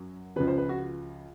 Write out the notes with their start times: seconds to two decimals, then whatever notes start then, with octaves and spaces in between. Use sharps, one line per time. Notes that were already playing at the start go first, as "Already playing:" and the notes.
Already playing: F#2 F#3
0.36 C#2 C#3 F3 B4
0.47 C5
0.58 B4
0.69 F#4